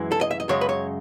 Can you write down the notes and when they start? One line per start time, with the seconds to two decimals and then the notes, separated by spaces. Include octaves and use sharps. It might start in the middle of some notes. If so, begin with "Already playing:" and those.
Already playing: F#2 E3 G#3
0.12 A4
0.21 D#5
0.31 E5
0.40 D#5
0.49 F#2 C#3 G#3 C#5
0.61 B4
0.69 C#5